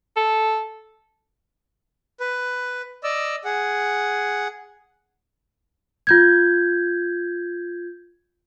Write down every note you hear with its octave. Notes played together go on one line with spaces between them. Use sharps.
A4
B4
D5 D#5 E6
G#4 F#5
F4 G6 G#6